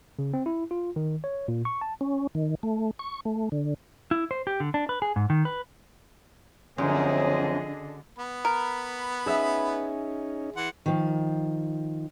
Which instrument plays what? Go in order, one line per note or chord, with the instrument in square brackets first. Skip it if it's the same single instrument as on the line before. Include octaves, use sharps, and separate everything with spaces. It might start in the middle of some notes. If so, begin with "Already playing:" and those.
[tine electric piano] C#3
C4
E4
F4
D#3
C#5
A#2
C#6
A5
[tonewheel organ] C#4
D#3
A3
C#6
A3
D3
[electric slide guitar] E4
C5
G4
D3
D4
B4
G#4
G#2
D#3
B4
[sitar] F#2 [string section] D3 [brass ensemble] F3 A#3 C4 [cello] G#4 D#5
[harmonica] B3 B5
[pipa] A#4
[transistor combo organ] C#4 D#4 [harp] G#4 E5
[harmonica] E3 F#5 C6
[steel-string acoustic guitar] D#3 F3